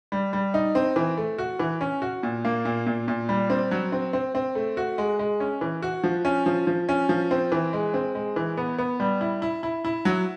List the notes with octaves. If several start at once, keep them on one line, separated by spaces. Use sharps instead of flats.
G3
G3
D#4
C4
E3
A3
F#4
E3
C#4
F#4
A#2
A#3
A#2
A#2
A#2
G3
C4
F#3
C4
C4
C4
A3
F#4
G#3
G#3
C#4
E3
F#4
F3
C#4
F3
F3
C#4
F3
C4
E3
G#3
C4
G#3
E3
B3
B3
G3
E4
E4
E4
E4
F#3